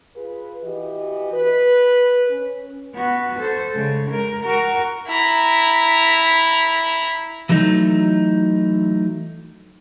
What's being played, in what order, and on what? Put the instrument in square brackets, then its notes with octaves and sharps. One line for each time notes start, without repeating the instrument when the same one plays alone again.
[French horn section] F4 G#4 B4
E3 F#4 G4 D#5
B4
C#4
[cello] B3 F#4
A4 C5
C#3 G#3
G#3 A#4
F#4 A#4
[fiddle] E4 A#5
[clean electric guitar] E3 F#3 A3 D#4